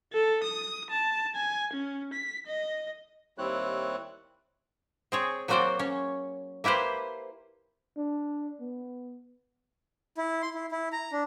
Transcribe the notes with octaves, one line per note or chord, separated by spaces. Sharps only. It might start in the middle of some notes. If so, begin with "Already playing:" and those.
A4
D#6
A5
G#5
C#4
B6
D#5
D#2 G3 C4 E4 C#5 F#6
C4 G#4 C#5
F#3 A#3 C4 F#4 C5 D5
C#4 C#5
A#3 E4 G4 B4 C5
D4
B3
E4
C6
E4
E4
A#5
D4